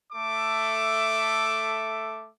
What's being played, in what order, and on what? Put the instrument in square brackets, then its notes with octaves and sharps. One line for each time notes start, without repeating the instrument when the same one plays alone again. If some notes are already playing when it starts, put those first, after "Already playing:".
[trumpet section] A3 A4 E5 D6